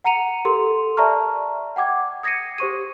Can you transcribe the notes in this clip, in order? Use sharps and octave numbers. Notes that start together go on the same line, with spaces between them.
F#5 A#5 C#7 D#7 F7
G4 A4 A#4 C6
D5 E5 A5 A#5 C#6 F6
F#5 G5 D6 G#6
D#6 G#6 A#6 C7 C#7 D#7
G4 C5 C#6 D#7